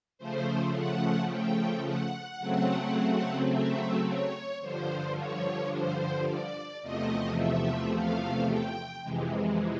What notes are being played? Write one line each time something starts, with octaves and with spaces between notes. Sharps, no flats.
C#3 F3 A3 C5
F#5
G5
F#5
C#3 F#3 A3 C4
E5
C#5
G2 D3 F3 C5
C#5
C5
D5
E2 C3 F3 A3 D#5
E5
F5
G5
F2 C3 E3 G#3